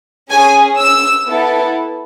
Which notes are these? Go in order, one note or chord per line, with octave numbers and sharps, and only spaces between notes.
C#4 G#4 G#5
E6
B3 E4 A4